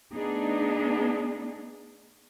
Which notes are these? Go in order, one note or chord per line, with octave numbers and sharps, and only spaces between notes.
A3 B3 D4 D#4 G#4